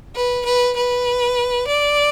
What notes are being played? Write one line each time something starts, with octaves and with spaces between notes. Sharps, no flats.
B4
B4
B4
D5